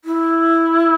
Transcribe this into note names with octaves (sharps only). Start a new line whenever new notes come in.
E4